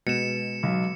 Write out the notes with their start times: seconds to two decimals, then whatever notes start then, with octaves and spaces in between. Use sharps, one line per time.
0.07 B2 G#3 B3 B4 C#7 E7
0.63 B1 F#3